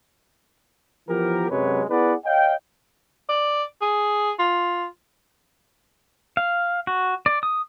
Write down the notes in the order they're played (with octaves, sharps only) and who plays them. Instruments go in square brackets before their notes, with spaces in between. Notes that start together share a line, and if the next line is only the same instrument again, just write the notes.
[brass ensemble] E3 F3 B3 G4 A#4
F#2 C3 F#3 G#3 B4 C#5
B3 E4 G#4 B4 D5 F#5
C#5 D#5 F5 G5
[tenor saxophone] D5
G#4
F4
[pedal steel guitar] F5
F#4
D5
D#6